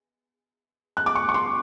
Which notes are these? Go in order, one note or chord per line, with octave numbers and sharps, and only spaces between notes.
F#6
D6
C#6
C#6
C6